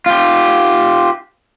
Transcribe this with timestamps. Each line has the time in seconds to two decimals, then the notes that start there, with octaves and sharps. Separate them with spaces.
0.06 F4 G4